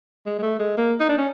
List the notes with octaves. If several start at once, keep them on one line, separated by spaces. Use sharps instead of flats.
G#3
G#3
A3
G#3
A#3
D#4
D4
C#4